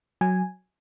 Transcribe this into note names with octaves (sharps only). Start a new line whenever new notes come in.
F#3 G#5